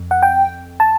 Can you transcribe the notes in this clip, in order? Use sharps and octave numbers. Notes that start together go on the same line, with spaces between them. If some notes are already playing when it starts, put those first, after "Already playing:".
Already playing: F2
F#5
G5
A5